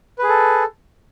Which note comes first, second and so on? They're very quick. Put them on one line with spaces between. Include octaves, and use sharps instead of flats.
B4 G#4 A4